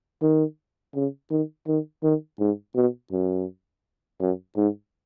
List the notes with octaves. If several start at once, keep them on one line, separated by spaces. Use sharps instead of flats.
D#3
C#3
D#3
D#3
D#3
G#2
B2
F#2
F#2
G#2